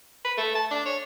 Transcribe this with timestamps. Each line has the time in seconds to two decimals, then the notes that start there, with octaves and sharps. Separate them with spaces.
0.25 B4
0.38 A3
0.56 A5
0.71 D4
0.86 C#5